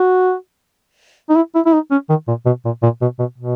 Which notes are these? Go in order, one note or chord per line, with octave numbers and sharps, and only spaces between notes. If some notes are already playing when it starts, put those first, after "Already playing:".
Already playing: F#4
D#4
E4
E4
E4
D#4
C#4
D#3
A#2
B2
A#2
A#2
B2
B2
B2